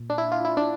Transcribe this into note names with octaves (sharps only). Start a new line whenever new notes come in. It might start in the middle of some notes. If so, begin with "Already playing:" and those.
Already playing: A#2
D4
E4
F4
E4
D4